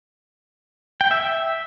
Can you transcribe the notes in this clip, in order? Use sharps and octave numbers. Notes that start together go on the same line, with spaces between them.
G5
E5
E5